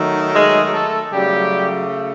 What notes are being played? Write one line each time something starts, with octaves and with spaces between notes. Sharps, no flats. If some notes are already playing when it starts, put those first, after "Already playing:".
Already playing: D#3 F#3 A3
G#3 G#4
A3 A4
C#3 F#3 G3 A3 G4